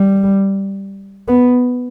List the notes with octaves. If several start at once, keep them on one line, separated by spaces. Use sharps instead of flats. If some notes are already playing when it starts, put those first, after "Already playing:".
Already playing: G3
B3